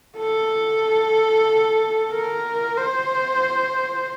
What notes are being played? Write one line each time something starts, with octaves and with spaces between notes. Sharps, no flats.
A4
A#4
C5